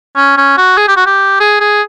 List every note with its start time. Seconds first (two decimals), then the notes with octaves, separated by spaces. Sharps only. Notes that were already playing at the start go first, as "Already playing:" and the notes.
0.16 C#4
0.37 C#4
0.57 F#4
0.77 G#4
0.88 G4
0.96 F#4
1.06 G4
1.40 G#4
1.60 G#4